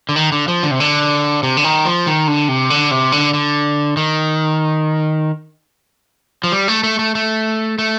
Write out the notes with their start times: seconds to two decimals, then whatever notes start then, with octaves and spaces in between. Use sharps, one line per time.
0.09 D3
0.16 D#3
0.32 D3
0.48 F3
0.63 D3
0.71 C3
0.80 D3
1.43 C3
1.57 D3
1.64 D#3
1.85 F3
2.07 D#3
2.28 D3
2.48 C3
2.70 D3
2.91 C3
3.12 D3
3.33 D3
3.97 D#3
6.44 F3
6.52 G3
6.68 A3
6.84 A3
6.99 A3
7.15 A3
7.79 A3